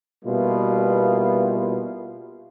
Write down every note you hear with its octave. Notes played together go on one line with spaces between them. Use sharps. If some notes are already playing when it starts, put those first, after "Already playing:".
B2 G3 A#3 B3 E4 F4